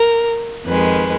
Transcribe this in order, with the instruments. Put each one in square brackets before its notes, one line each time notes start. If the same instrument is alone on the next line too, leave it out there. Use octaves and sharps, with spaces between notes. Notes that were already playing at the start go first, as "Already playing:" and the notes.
Already playing: [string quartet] A#4
F2 D#3 G#3 B4